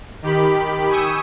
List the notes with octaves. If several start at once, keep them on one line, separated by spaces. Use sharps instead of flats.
D#3 G4 B5
G#5 C#6 D#6 E6 G6